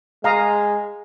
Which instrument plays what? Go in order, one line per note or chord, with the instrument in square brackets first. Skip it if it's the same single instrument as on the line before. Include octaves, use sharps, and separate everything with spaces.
[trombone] G#3 [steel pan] F5 A#5 D#6